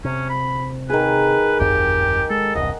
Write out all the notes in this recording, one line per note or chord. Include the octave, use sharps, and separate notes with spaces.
C3 C#4
B5
D#3 G#4 B4
D1 G1 F2 G4
G#3 A4
E1 C2 G2 D#5 F#5